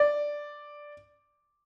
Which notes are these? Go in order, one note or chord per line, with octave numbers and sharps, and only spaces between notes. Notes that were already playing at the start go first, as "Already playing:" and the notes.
Already playing: D5